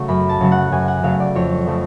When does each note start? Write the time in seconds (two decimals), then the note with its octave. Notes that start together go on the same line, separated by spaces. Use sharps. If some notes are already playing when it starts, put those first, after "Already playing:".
Already playing: C#3 F#3 A3 C#6
0.08 F#2 B5
0.29 A5
0.41 C#3 F#3 A3
0.51 F#5
0.72 F#2 G#5
0.88 F#5
1.03 C#3 F#3 A3 F5
1.20 D5
1.35 F2 C#5
1.67 C#3 F3 A3